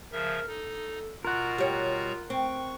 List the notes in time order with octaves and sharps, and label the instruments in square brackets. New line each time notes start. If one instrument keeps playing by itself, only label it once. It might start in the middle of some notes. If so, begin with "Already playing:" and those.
[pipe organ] C#3 F3 E5 [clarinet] A#4
[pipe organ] D#4 [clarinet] A4
[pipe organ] B2 F#4 A#5 [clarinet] F4 [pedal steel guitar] A#4 F#5
[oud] G3 C#5
[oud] C4 [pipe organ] C#6